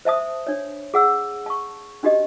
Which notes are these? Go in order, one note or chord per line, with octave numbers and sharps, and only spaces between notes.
C5 E5 A5 D#6
D4 C#5
G#4 F#5 E6
A5 C#6
C#4 D4 F#4 G4 D#5